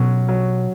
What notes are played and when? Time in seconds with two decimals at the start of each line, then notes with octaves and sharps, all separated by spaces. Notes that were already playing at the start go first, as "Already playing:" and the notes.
Already playing: B2 F#3 C#4
0.29 F#3